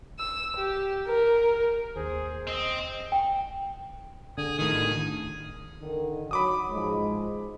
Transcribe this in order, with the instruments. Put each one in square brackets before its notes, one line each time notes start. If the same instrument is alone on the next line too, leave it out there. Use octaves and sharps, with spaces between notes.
[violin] E6
G4
A#4
[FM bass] D#2 [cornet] G#4 [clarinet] C5
[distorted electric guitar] C4 [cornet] D#5
[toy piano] G5
[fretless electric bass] D3 [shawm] G#4
[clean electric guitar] A2 D#3 [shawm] G#4
[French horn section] D3 D#3
[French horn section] F#3 [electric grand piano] B5 D6 D#6
[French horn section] G#2 F3 G#3